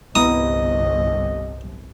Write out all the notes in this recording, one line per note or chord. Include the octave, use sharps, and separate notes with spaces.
G1 C2 A2 B3 E4 D#5 A#5 D#6